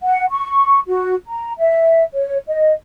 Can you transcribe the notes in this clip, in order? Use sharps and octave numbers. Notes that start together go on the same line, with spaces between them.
F#5
C#6
F#4
A#5
E5
C#5
D#5